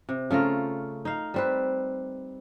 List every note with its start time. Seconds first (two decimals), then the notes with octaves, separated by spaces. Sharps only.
0.09 C3
0.31 C#3 A3 F4 A#4
1.05 D#4 F5
1.34 G3 C4 B4